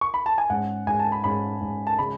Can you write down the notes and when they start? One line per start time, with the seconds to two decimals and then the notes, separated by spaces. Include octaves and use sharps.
0.01 C#6
0.14 B5
0.26 A5
0.38 G#5
0.50 G#2 G#3 C#4 F#5
0.87 G#2 G#3 C#4 G#5
1.00 A5
1.12 B5
1.24 G#2 G#3 C#4 B5
1.61 G#2 G#3 C#4
1.87 A5
1.99 C#3 G#3 C#4 B5